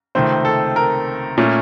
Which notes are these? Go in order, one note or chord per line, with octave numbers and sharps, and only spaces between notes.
C#2 C3 D#3 A3 C4 C5
A4
A#4
A#2 A3 C#4